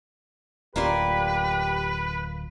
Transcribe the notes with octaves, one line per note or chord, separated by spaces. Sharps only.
D1 A#3 F4 G4 B4 D5